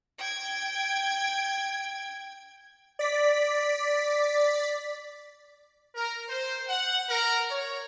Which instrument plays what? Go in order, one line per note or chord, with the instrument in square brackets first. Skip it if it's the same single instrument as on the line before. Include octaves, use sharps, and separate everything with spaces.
[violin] G5 G#6
[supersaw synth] D5 B6
[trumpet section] A#4
C5
F#5
A#4
C#5